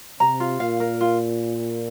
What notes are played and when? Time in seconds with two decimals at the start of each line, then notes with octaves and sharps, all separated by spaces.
0.20 C3 A#5
0.40 F4
0.60 A#2 F5
0.80 A#4
1.01 F4